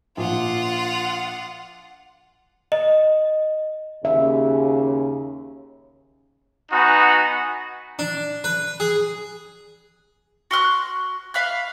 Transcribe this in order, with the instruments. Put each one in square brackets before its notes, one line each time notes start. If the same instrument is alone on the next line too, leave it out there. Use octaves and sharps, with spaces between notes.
[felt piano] A#1 [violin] F4 F#5
[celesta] D#5
[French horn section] D#2 C#3 [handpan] E5
[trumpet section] B3 D#4 F#4 G#5
[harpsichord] D4
B4
G#4
[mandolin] F#4 C6 F6 F#6
E5 F5 B5 F#6